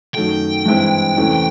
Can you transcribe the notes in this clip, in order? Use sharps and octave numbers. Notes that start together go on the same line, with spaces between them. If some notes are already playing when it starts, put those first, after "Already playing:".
F#2 D#3 F#3 A3 G5
G2 E3 G#3 C4 E4
E2 C3 E3 A3 C#4